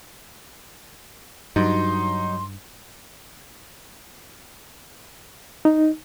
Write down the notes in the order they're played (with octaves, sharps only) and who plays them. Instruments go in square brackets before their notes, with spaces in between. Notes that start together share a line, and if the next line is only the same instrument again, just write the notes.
[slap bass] G2 [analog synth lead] F#3 [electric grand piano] D#4 [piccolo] C6
[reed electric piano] D#4